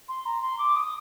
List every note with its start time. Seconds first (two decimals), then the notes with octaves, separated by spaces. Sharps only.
0.08 C6
0.26 A#5
0.42 C6
0.58 D6
0.76 D#6